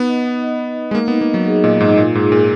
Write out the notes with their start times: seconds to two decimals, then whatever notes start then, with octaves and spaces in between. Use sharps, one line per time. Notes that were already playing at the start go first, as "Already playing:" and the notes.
Already playing: B3 D#4
0.09 D#5
0.26 F#5
0.44 D#5
0.60 D#5
0.78 D#5
0.91 G#3
0.95 A#3 D#4
1.08 B3 D#4
1.21 A#3
1.30 F#3 D#5
1.46 G#4
1.64 A#2 D#5
1.80 G#2 D#4
1.97 A#2 F4
2.15 G#2 G#4
2.32 A#2 G#4